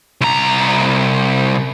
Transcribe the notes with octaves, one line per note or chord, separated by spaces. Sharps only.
C2 A#5